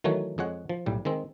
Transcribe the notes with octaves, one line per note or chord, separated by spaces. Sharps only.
D#3 E3 F#3 A3 F#4 C#5
F2 G#3 C#5 F#5
F3
B1 A2 G3
D#3 G#3 C4